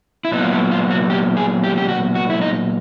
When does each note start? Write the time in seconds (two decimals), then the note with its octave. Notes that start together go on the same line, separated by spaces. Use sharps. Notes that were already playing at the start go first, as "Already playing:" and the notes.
0.25 E4
0.32 A#2 F#3 B3 D#4
0.42 F4
0.52 E4
0.72 F4
0.90 F#4
1.10 G4
1.37 G#4
1.63 G4
1.78 G4
1.89 F#4
2.15 F#4
2.30 E4
2.41 D#4